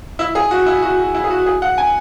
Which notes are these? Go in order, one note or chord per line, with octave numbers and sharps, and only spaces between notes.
E4
G#4
F#4
E4
F#4
F#4
E4
G#4
F#4
G#4
F#5
G#5